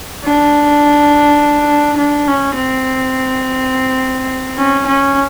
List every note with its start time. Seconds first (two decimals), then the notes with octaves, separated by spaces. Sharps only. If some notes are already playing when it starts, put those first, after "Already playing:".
0.24 D4
1.97 D4
2.28 C#4
2.55 C4
4.58 C#4
4.87 C#4